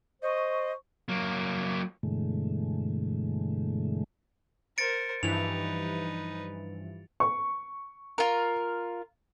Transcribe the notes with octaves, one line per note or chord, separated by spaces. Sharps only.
C5 D#5 C#6
F#3 A#3
G2 B2 D3 E3 G#3 A3
A#4 C5 A6 C#7 D7
G2 E3 F3 D#4 B4 F7
C#6
F4 A#4